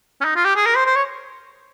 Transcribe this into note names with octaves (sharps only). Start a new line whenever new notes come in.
C#4
D#4
F4
G4
G#4
A#4
C5
C5
C#5